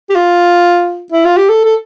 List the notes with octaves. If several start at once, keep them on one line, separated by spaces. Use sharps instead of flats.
G4
F4
E4
F4
G4
A4
A4